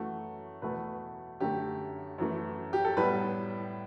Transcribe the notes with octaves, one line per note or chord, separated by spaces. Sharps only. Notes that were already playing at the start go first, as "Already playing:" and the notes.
Already playing: F#2 E3 A3 F#4
E2 B2 A3 B4
F#2 D3 A3 G4
F#2 E3 A3
G4
A4
A2 G3 B3 B4